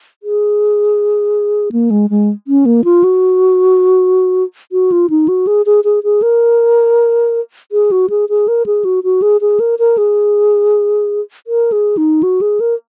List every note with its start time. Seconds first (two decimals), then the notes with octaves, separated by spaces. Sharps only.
0.23 G#4
1.72 A#3
1.91 G#3
2.10 G#3
2.48 C#4
2.66 A#3
2.84 F4
3.04 F#4
4.72 F#4
4.92 F4
5.10 D#4
5.28 F#4
5.47 G#4
5.66 G#4
5.84 G#4
6.04 G#4
6.22 A#4
7.72 G#4
7.91 F#4
8.10 G#4
8.29 G#4
8.48 A#4
8.66 G#4
8.85 F#4
9.04 F#4
9.22 G#4
9.41 G#4
9.60 A#4
9.79 A#4
9.98 G#4
11.47 A#4
11.72 G#4
11.97 D#4
12.23 F#4
12.41 G#4
12.60 A#4